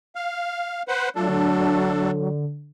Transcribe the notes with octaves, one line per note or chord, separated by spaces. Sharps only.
F5
B4 C5 F#5
F#3 A3 D4 F4 A4
D3